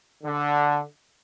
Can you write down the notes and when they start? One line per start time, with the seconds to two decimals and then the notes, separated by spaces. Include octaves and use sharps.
0.23 D3